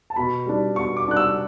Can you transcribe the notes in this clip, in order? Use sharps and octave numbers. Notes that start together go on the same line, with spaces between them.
A5
B2 B5
G3 D4
B2 C#6
D6
G3 D4 F#6
E6